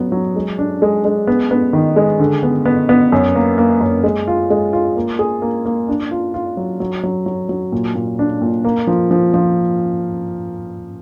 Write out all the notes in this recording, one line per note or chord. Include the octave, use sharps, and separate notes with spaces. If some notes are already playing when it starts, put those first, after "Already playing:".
Already playing: F#3 B3
F#3
G#3
D4
G#3
G#3
B3
B3
D#3
G#3
D3
B3
B3
B3
F#2
A#3
A#3
F#2
G#3
F4
G#3
F4
A#3
G#4
A#3
A#3
D4
F4
F4
F#3
F#3
F#3
F#3
F#3
A#2
A#2
D4
A#2
A#3
F3
F3
F3